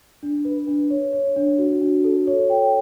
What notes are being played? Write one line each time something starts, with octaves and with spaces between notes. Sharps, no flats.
D4
B4
D4
C#5
C#5
D4
F#4
D4
A4
C#5
G5